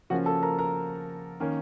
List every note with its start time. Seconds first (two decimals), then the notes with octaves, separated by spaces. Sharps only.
0.10 C#3 F3 A#3 C#4 F#4 F#5
0.26 A4 A5
0.43 A#4 A#5
0.59 A#4 A#5
1.40 D#3 A#3 C#4